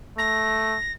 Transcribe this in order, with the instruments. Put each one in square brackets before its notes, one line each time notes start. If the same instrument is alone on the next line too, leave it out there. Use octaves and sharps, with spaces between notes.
[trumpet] A3 [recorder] A#6